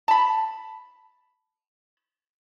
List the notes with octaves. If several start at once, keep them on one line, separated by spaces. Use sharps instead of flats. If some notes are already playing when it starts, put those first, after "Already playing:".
A5 B5